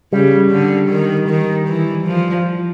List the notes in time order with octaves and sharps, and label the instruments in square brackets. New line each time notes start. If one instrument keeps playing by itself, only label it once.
[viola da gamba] C#3 [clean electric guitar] G3
[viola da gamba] D3
D#3
D#3
E3
F3